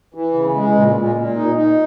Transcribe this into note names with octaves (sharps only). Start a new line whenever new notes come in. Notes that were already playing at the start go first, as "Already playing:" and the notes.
E3
C#3
G#3
A#2
A#2
A#2
D#4
D#4